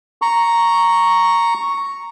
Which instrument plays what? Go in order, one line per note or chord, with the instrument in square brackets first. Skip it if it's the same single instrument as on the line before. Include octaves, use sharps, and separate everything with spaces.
[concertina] A#5 C#6